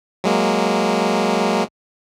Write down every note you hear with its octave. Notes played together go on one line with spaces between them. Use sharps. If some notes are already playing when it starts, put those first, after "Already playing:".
F#3 G#3 A#3